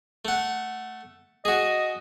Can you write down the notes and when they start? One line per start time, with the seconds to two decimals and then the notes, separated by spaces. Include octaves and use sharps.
0.25 A3 F#5
1.45 F#4 G#4 D#5